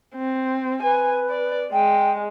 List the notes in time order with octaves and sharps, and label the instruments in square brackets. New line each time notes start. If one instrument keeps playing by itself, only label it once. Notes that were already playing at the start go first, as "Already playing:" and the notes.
[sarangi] C4
[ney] B4 [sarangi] G#5
[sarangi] D5
[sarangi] G#3 [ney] G5